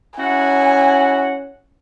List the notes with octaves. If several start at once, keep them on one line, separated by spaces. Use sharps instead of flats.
C#4 E4 F#4 F#5 G#5